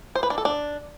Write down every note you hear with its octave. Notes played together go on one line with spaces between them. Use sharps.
C5
B4
D4
A4
D4